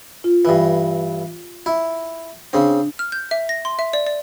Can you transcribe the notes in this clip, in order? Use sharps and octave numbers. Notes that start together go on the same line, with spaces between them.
F4
G2 E3
E4
C#3 C4 D4
F6
G6
E5
A#6
C6
E5
D5
D5